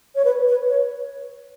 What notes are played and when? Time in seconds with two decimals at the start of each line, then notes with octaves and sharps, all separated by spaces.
0.15 C#5
0.25 B4
0.48 B4
0.69 C#5